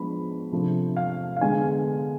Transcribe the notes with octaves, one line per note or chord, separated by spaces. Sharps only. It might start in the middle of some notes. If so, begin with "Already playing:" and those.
Already playing: F3 G#3 B3 D4 B5
C3 F3 A3 D4
F5
F5
D3 G#3 B3 G#5